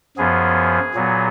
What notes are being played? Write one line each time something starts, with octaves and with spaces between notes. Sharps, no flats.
F#2 F3 B3 G#4
A#2 F#3 B3